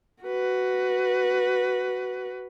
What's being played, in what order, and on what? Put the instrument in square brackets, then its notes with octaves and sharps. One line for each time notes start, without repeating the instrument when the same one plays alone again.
[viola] F#4 B4